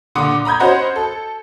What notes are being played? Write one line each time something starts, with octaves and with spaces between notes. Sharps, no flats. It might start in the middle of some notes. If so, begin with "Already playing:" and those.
A#2 D3 F#5 C6 D6 D#6
A#5 B5 D#6 G6 G#6
C#4 F#4 C5 D#5 F#5 B5
A4